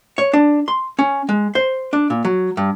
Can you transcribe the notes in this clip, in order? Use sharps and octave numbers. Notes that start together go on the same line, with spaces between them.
C#5
D4
C6
C#4
G#3
C5
D4
A#2
F#3
G2